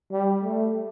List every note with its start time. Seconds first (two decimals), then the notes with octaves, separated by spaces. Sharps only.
0.11 G3
0.43 A3